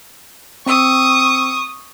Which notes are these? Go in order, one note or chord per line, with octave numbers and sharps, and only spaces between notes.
C4 C#6 D#6 E6